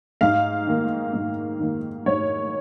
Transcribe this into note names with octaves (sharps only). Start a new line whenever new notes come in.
G#2 F5
D#3 A#3
G#2
D#3 A#3
G#2 C#5